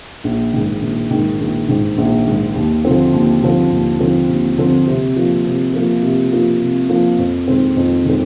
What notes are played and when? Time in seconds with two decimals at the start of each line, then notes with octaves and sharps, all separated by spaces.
0.24 A#1
0.54 G#2 D#3
0.82 A#1
1.11 G#2 D#3
1.40 A#1
1.69 G#2 D#3
1.98 A#1
2.27 G#2 D#3
2.56 D#2
2.85 D3 F3 C4
3.13 D#2
3.43 D3 F3 C4
3.71 D#2
4.00 D3 F3 C4
4.29 D#2
4.58 D3 F3 C4
4.87 C3
5.16 F3 A#3 F4
5.45 C3
5.74 F3 A#3 F4
6.02 C3
6.32 F3 A#3 F4
6.61 C3
6.89 F3 A#3 F4
7.19 F2
7.47 D#3 G#3 C4
7.76 F2
8.05 D#3 G#3 C4